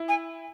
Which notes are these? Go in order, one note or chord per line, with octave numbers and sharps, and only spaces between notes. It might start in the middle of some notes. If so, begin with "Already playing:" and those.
Already playing: E4
G#5